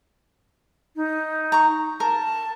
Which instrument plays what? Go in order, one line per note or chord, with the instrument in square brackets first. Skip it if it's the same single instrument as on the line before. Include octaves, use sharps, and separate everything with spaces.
[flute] D#4
[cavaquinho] A#5 C#6
[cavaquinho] A#4 [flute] A5